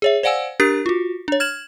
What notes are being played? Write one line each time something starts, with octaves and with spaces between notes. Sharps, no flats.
G#4 C#5 E5
C5 D5 F5 F#5 G#5 E6
D4 G4 A#4 A6 C7
F4 F#4
D4 C#5
F6 G#6 E7 F#7